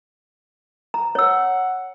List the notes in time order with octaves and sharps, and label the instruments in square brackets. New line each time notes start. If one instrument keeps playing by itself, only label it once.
[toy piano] A#5
[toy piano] C#5 E6 [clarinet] F#5